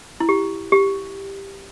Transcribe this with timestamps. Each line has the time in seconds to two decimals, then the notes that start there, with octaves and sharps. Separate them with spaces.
0.20 E4
0.29 G4
0.72 G4